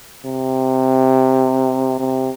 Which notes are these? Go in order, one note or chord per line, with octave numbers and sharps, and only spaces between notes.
C3
C3